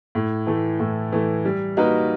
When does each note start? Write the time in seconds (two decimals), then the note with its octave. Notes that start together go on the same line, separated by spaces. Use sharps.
0.15 A2
0.47 E3 A3
0.80 A2
1.12 E3 A3
1.45 G3
1.77 A#3 D#4 F#4 B4